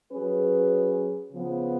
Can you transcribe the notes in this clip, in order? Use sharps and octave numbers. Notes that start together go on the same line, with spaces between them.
F#3 C#4 G#4 B4
C#3 F3 B3